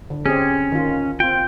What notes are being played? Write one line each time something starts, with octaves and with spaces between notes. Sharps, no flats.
D3
C4 C#4 G4 G#4
D#3 F4
C4 F4 G5